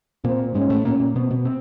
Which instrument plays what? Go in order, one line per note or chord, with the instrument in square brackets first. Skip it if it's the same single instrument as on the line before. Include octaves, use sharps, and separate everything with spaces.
[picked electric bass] A#2 A#3 [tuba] C4
[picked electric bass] G#2 G#3 [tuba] C#4
[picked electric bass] A2 A3
[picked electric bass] A#2 A#3 [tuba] C#4
[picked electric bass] A#2 A#3
[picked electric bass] B2 B3 [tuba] C4
[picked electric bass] B2 B3
C4